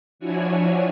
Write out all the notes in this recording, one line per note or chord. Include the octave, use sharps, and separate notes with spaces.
F3 D4 E4 F#4 C#5 G#5